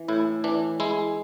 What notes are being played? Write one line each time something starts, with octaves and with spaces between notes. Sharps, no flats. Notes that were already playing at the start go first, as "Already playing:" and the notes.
Already playing: E3
A2 E4
E3 D4
G#3 E4